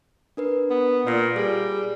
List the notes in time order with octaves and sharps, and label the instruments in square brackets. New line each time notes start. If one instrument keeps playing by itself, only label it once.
[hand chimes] D4 A#4 B4
[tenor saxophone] B3
[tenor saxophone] A#2 [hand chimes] B4 D5 A#6
[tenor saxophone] G3 [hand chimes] G#4